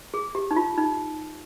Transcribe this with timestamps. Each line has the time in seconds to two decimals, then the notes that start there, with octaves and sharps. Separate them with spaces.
0.14 G#4
0.35 G4
0.51 D#4
0.56 F4
0.78 D#4